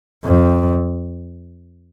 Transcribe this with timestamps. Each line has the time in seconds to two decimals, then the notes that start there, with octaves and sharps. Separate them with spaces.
0.25 F2